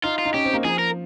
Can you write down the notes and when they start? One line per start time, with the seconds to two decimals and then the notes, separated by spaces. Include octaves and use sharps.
0.04 D#4 F4
0.18 F4
0.26 D#4
0.34 C#4 G4
0.45 C4
0.54 A#3
0.64 F3 G#4
0.79 A#4